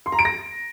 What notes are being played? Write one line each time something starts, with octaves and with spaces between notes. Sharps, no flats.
C6
A#5
D7
A#6